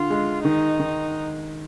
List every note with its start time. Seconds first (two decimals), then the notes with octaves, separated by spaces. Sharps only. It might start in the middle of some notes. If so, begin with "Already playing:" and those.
Already playing: D3 F4
0.10 G#3
0.44 D#3 D#4
0.80 D#3